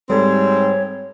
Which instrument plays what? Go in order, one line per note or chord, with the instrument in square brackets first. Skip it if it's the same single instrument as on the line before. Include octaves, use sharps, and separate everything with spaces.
[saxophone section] G#2 C4 [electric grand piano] G3 A4 [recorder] C#5